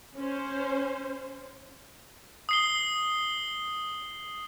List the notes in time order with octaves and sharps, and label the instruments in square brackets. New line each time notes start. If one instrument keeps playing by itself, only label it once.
[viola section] C#4 C5
[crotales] D#6 C7 G7